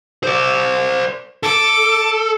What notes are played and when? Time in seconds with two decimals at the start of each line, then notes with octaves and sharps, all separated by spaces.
0.24 C5 D5
1.43 A4 D6